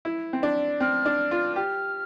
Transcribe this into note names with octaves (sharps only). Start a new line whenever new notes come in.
E4
C4
D4
C4 F6
D4
F4
G4 F6